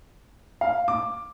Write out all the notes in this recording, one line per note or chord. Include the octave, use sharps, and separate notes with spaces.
F5
D6